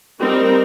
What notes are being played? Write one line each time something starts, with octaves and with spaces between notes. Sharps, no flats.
G3 C4 D#4 A#4